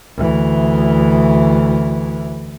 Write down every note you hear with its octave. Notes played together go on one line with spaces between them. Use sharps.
D2 E3